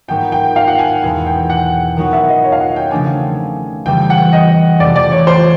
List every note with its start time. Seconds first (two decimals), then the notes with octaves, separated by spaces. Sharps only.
0.08 G#2 D#3 F#3 B3 G5
0.32 G5
0.56 F5
0.68 F#5
0.79 G#5
1.02 E2 B2 G#3 B3 G#5
1.27 G5
1.50 F#5
1.97 D#3 F#3 B3 D#4 F#4
2.13 E5
2.28 D#5
2.44 C#5
2.52 F5
2.60 F#5
2.76 G5
2.91 C#3 F3 A3 D4 G#5
3.85 F2 C#3 E3 G3 G5
4.10 F#5
4.33 D#5
4.80 F2 C3 E3 A3 C4 D5
4.96 D5
5.12 C#5
5.27 C5